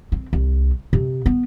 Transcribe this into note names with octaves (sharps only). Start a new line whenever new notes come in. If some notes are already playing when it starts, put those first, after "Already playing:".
C4
C2
C3
B3